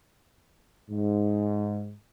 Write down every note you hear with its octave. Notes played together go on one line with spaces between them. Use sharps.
G#2